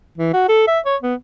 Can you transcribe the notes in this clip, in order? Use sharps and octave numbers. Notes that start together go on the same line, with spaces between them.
E3
F#4
A4
E5
C#5
B3